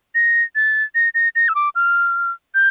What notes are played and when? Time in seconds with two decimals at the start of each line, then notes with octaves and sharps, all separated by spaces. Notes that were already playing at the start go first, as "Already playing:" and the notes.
0.15 A#6
0.56 A6
0.95 A#6
1.15 A#6
1.36 A#6
1.49 E6
1.55 D6
1.75 F6
2.55 G6